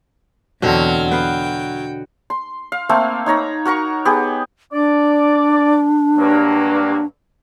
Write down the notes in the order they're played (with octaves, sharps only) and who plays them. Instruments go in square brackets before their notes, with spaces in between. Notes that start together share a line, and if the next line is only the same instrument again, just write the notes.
[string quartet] E2 F6 [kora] B2 D3 C4 [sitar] F#3
[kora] B3 F5 [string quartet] G5
[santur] C6
F5
A3 A#3 C4 F5
D#4 C#5 A#5 B5
F#4 A#4 A#5 C#6
B3 G4 G#4
[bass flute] D4 [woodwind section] D5
[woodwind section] G2 F#3 A#3